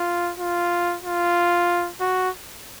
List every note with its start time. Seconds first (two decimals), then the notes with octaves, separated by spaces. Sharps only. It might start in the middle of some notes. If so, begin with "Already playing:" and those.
Already playing: F4
0.39 F4
1.03 F4
2.01 F#4